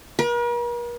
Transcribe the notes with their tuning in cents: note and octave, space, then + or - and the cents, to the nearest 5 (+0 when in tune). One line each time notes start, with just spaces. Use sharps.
A#4 +45